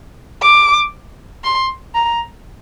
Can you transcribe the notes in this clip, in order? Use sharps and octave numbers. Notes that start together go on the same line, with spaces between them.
D6
C6
A#5